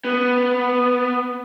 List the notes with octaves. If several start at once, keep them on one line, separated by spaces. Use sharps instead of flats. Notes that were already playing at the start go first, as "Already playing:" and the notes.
B3